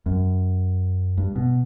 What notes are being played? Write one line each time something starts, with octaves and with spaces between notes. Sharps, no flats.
F#2
G2
B2